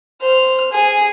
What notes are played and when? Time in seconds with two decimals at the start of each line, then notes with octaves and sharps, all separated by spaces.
0.21 C5 F6
0.72 G#4